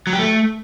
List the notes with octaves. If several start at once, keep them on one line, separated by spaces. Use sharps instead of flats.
F#3
G4
A3